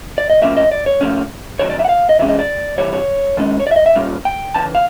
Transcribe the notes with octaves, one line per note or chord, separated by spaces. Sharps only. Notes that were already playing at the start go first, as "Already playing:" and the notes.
D5
D#5
A2 F3 A#3 C#4 E5
D#5
D5
C#5
A#2 F3 A3 C#4
C3 D#3 F#3 C#5
D5
E5
F#5
F5
D#5
C3 E3 G#3 C#4 E5
D#5
D5
C3 E3 G3 C#5
C#5
D#3 G#3 C#4
C#5
D5
E5
D#5
E5
A#2 G3 A#3 C#4
G5
C#3 E3 A5
F5